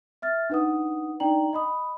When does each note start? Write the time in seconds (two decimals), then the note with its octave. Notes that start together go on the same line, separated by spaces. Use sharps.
0.22 E5 F6 A6
0.50 D4 D#4 B4 F#5 D#6
1.20 D4 D#4 D5 G5 A#5 F#7
1.53 D#5 B5 D#6